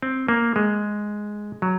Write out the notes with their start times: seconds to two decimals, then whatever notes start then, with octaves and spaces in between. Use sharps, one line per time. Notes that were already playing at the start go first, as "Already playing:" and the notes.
0.02 C4
0.28 A#3
0.56 G#3
1.62 F#3